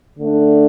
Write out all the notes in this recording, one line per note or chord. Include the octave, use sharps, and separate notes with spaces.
D3 A3 D4